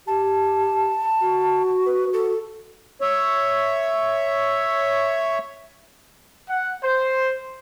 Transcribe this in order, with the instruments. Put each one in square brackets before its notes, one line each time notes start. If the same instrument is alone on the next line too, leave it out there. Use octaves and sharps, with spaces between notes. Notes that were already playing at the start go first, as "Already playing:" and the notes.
[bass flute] G4 [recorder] A5
[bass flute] F#4
[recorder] B4
A4
[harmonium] C#5 E5
[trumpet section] F#5
C5